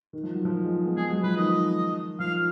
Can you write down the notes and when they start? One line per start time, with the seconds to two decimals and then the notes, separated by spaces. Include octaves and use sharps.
0.13 D#3
0.23 F3
0.34 F#3
0.45 F3
0.55 D#3
0.64 G#3
0.76 G#3
0.86 B3
0.96 G#3 G#4
1.09 F#3
1.23 F3 B4
1.37 D#3 D#5
2.20 F3 F5